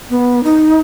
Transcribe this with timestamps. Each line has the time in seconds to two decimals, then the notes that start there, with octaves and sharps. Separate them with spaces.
0.10 B3
0.44 D#4